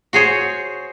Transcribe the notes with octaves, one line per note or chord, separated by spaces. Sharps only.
F#4 G#4 C5 C#5